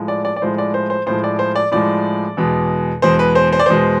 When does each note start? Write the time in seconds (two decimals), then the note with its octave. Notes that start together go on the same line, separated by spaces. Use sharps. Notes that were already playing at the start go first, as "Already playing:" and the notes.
Already playing: A2 F3 G#3
0.08 D5
0.25 D5
0.36 D5
0.42 A2 F3 G#3 C5
0.58 D5
0.74 C5
0.90 C5
1.06 A2 F3 G#3 C5
1.24 D5
1.39 C5
1.56 D5
1.72 A2 F3 G#3 D5
2.37 E2 B2 G#3
3.02 E2 B2 G#3 C5
3.19 B4
3.35 C5
3.52 C5
3.59 D5
3.66 E2 B2 G#3 C5